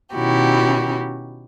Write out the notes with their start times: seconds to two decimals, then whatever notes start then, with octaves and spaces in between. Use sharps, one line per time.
0.13 B2 D#3 C#4 E4 F#4 G4